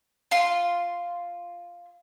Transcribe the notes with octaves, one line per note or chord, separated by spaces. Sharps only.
F4 C6